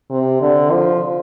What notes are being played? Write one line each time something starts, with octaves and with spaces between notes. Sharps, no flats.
C3
D3
F3